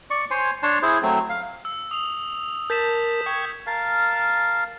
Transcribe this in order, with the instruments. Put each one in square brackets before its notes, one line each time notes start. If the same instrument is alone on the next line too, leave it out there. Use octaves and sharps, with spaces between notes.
[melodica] D5 C#6
C5 C#5 G#5 C6
D4 C#5 A5 C6
E4 G#4 C5
F#3 A3 C4
F5
[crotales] E6
D#6 F7
[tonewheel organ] A#4 A5 [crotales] G6 B6 E7
[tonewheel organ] G5 C#6 G#6
[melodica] A#4 F5 A5